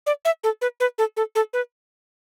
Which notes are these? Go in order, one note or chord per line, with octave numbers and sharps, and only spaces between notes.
D5
E5
A4
B4
B4
A4
A4
A4
B4